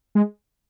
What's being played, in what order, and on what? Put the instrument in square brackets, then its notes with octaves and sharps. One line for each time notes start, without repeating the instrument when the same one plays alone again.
[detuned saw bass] G#3